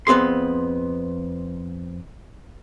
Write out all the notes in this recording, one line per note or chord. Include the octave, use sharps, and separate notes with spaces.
F2 B3 C4 G#4 C6